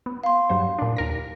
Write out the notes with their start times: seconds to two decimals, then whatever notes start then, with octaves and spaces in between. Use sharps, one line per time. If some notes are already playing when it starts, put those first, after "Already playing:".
0.06 B3
0.24 F5 C6
0.49 G2 F#3 C5
0.79 A#2 D4
0.97 D#2 A#4 A#6